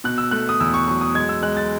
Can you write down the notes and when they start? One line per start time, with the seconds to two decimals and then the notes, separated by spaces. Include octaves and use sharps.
0.04 B2 F#6
0.18 E6
0.31 A3 F#6
0.49 D#6
0.60 E2 E6
0.74 C#6
0.88 F#3 C#6
1.01 D#6
1.15 G#3 G#6
1.29 E6
1.43 G#3 F#6
1.57 A6